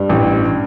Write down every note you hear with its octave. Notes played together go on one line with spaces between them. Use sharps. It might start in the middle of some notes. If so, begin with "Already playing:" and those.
Already playing: G2
A1